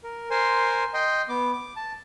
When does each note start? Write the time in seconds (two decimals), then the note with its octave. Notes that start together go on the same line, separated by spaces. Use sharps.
0.04 A#4
0.30 A#4 C5 G#5 C6
0.94 D#5 G5 C6
1.29 B3 D6
1.52 D6
1.76 A5